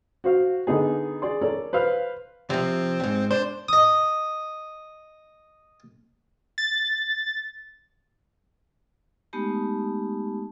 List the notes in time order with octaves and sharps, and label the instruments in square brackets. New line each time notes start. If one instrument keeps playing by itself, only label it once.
[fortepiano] F#4 C5 F5
D3 B3 D#4 G#4
G#4 D5 C6
A4 A#4 C#5 D5
B4 C5 F5 F6
[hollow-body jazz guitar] C3 F3 [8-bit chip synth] C4
[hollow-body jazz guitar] F2 G#2
[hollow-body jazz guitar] D4 [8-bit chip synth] C5
[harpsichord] D#5 D#6
[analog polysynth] A6
[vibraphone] G#3 A3 B3 D#4 G4 A5